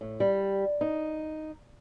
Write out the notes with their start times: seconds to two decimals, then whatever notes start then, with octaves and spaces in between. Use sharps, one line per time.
0.01 A2
0.20 G3
0.81 D#4